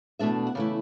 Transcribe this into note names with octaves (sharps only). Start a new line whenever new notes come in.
E2 B2 A3 D4 E5
F#5
C#3 E3 A3 E4 D5